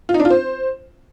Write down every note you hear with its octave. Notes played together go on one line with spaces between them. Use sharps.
F4
D#4
D4
F4
C5